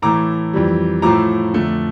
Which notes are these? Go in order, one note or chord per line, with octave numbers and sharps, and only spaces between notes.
A2 E3 A3 A#5 D6
F2 E3 G3
A2 F3 A3 A#5 D6
F2 D3 A3